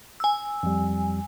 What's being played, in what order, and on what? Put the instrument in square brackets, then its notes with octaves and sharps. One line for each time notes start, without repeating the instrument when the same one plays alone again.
[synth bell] G#5 E6
[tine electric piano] F2 G3